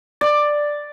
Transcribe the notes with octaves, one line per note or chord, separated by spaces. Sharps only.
D5